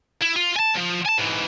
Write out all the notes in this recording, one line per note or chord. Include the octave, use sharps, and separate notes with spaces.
E4
F4
G#5 A5
D2 F3
G#5 A5
G#2 E3